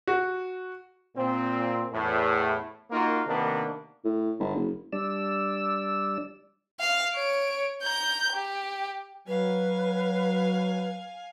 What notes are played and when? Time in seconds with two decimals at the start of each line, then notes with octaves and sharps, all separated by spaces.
0.07 F#4
1.16 A#2 C4
1.93 E2 A2
2.91 A#3 D#4 F4 F#4 A#4
3.27 C3 D#3 A#3 B3 D4
4.04 A2
4.39 G1
4.55 F#1
4.93 G3 D4 D5 E6
6.80 F5
7.14 C#5 D7
7.83 A#5 G6
8.33 G4
9.28 F#3 B4 F5 G#5